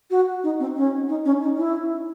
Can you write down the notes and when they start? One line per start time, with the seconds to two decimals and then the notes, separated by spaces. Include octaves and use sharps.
0.11 F#4
0.44 D#4
0.60 C4
0.76 C#4
1.09 D#4
1.25 C#4
1.42 D#4
1.57 E4